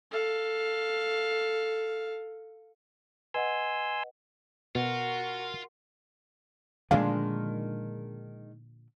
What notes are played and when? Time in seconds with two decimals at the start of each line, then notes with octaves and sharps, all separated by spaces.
0.11 A4 F5
3.34 B4 D#5 F#5 G#5 C6 E6
4.75 B2 F4 F#4 A#4
6.91 A#2 D3 D#3 F3 G#3 D4 F5